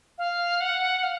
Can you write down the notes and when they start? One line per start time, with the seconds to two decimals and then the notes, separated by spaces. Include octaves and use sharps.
0.18 F5
0.60 F#5
1.03 F5